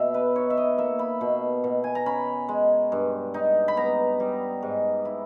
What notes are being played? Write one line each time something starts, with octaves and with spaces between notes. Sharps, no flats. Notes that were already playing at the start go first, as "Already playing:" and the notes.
Already playing: B2 E5
B4
D#4 C#5
E5
D#5
A#3 E5
B5
B2
B2
G#5
A#5
C#4 B5
G#3
G2
D#4
B5
B3 A#5
G3
G#2
E4